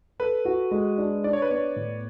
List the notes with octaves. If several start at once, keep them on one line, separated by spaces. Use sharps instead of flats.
A4 B4
F#4
G#3
D4
D4 D5
C#5
B4
B3 C#5
A2